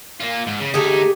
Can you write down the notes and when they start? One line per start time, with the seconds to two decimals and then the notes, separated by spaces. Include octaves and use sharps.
0.20 A#3 F4
0.47 G#2
0.60 C#3
0.74 D2 A3 D#4 G4 G#4